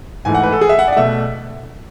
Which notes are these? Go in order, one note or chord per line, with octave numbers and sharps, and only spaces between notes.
G#2 E3 A3 G#5
F#5
B4
A4
G#4
E5
F#5
D5
F#5
B2 A3 E5